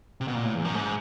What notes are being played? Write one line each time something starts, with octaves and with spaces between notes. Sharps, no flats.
C3
B2
A#2
A2
E2
F#2
G#2